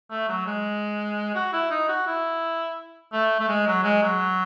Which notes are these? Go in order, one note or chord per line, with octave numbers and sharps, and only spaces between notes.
A3
F#3
G#3
F#4
E4
D#4
F#4
E4
A3
A3
G#3
F#3
G#3
F#3